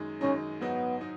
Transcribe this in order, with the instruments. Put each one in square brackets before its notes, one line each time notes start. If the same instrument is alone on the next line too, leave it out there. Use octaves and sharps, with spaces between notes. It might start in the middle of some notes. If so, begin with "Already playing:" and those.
Already playing: [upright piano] F#2 D#3 G#3 D#4
[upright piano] F#2 D#3 G#3 D#4 [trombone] C#4
[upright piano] G#2 F#3 D#4 [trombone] B3
[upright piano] D#4